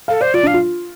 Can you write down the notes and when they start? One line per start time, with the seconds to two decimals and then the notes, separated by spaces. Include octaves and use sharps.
0.08 A4 F5
0.21 C5 D5
0.34 F4 D5
0.43 D4 F5
0.54 F4